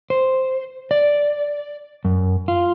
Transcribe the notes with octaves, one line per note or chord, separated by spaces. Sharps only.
C5
D5
F#2
F4